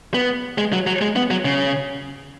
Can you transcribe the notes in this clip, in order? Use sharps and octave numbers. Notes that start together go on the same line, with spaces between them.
B3
G#3
F#3
F#3
G#3
B3
F#3
C#3